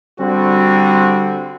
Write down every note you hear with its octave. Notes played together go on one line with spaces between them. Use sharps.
D3 G3 C4 F#4